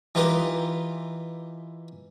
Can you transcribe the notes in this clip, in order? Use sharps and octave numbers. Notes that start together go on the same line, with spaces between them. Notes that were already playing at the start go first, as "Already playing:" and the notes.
E3 D#4 F4 G4 A#4 B4